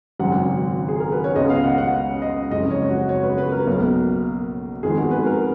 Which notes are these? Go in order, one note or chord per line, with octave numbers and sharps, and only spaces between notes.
G#1 F#2 C#3 F#3 F#5
G#4
A#4
B4
C#5
C#2 C#3 G#3 B3 D#5
F5
F#5
F#5
D#5
F#1 F2 C#3 G#3 D#5
C#5
F#4
C#5
B4
B4
A#4
B1 B2 A#3
F2 D#3 G#3 B3 G#4
F#4
B4
A#4